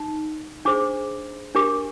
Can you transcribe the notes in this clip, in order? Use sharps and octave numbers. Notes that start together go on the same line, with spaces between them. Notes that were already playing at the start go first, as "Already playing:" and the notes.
Already playing: D#4
D4 G#4 C5 D6
D4 G4 A#4 D6